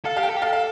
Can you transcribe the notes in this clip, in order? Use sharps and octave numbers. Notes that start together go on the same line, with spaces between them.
A4 F5
G4 F5
G5
A4
G4
A4 F5
F5